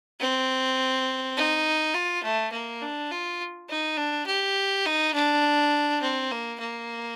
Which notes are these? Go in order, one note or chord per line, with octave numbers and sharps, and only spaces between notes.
C4
D#4
F4
A3
A#3
D4
F4
D#4
D4
G4
D#4
D4
C4
A#3
A#3